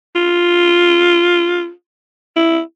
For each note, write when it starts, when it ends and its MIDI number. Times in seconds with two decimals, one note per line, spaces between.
0.15 1.71 65
2.36 2.60 64